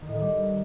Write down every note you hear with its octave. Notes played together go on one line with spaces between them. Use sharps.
D#3
A2
D#3
G3